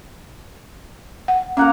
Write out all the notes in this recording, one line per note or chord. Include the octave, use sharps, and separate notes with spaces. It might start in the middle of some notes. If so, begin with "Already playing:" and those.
F#5
A#3 C#4 F#5 A#5